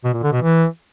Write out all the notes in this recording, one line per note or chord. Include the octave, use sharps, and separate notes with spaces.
B2
A#2
D3
B2
E3